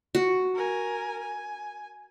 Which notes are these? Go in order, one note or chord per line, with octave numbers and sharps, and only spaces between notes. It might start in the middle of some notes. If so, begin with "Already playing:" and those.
F#4
A#4 G#5
G#5